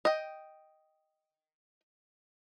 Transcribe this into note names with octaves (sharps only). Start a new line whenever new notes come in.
D#5 G5